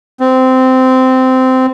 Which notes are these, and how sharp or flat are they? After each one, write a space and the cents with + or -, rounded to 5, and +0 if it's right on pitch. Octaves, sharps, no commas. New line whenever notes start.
C4 -15